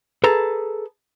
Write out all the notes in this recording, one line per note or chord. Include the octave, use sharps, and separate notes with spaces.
G#4 A4 B4 A#5